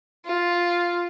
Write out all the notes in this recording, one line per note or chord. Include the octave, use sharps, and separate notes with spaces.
F4